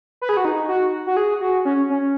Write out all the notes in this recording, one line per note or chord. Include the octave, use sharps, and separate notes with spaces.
B4
G#4
F#4
D#4
F#4
F#4
G#4
F#4
C#4
C#4